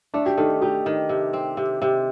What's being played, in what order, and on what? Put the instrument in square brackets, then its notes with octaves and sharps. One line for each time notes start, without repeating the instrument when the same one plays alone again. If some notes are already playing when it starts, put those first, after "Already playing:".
[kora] A3 [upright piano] D4
[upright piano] G4
[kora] D#3 [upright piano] A4
[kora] D#4 [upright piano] G4
[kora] D#3
C3
C4
C3
C3